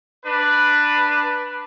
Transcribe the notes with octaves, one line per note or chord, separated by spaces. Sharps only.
D4 B4